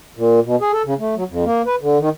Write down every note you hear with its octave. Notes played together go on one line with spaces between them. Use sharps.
A#2
B2
G#4
A4
C#3
A3
F#3
F2
A#3
B4
D3
D#3